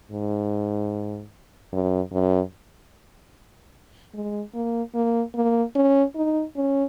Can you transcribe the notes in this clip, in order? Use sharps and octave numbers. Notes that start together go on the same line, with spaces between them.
G#2
F#2
F#2
G#3
A#3
A#3
A#3
C#4
D#4
C#4